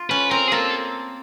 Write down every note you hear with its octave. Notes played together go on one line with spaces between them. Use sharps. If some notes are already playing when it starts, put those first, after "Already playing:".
Already playing: F4
C#4 B4
C4 A#4
G#4
A#3 A4